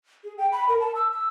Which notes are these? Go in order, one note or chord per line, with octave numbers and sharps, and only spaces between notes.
G#4
G5
B5
A#4
A5
E6
E6